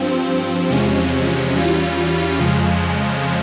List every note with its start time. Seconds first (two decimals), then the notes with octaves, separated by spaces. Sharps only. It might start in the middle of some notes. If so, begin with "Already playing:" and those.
Already playing: G2 F3 C4
0.70 E2 C3 F3 G#3 C#4
1.54 E2 E3 G3 C#4 F4
2.38 F2 C#3 F3 G#3